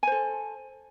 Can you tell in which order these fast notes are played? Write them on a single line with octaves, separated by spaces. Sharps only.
G#5 C5 A4